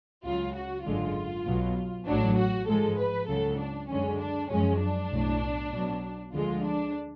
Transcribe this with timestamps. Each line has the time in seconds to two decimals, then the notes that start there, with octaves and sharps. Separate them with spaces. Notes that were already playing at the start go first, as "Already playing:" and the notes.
0.24 C#2 C#3 F#3 F4
0.54 F#4
0.84 G#1 F#2 D3 G#3 F4
1.46 B1 B2 F#3
2.06 A1 A2 F#3 D4
2.37 F#4
2.67 G#1 G#2 F3 G#3 A4
2.97 B4
3.28 C#2 C#3 F#3 A4
3.58 D4
3.89 F#2 D3 G#3 C#4
4.19 D4
4.49 F#2 F3 G#3 C#4
4.80 D4
5.11 B1 A2 F#3
5.71 B1 B2 F#3
6.32 D2 D3 F3 G#3 F4
6.62 D4